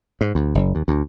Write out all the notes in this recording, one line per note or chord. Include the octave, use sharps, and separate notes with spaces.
G#2
D2
F#1
D#2
D2